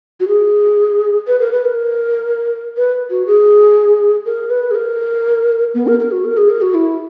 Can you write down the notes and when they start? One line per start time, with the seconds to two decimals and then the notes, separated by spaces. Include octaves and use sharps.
0.20 F#4
0.28 G#4
1.28 B4
1.40 A#4
1.52 B4
1.65 A#4
2.77 B4
3.10 F#4
3.27 G#4
4.26 A#4
4.50 B4
4.71 G#4
4.75 A#4
5.74 B3
5.87 A#4
6.00 A#4
6.12 F#4
6.25 A#4
6.37 G#4
6.50 A#4
6.61 F#4
6.74 E4